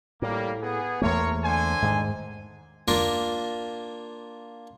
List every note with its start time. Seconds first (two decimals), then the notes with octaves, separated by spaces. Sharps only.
0.22 A2 G3 A#3
0.62 B3 G#4
1.02 E2 A3 A#3 A#4 C5 C#5
1.44 D3 C5 G#5
1.82 G#2 D#3
2.88 A#3 D4 F4 A#4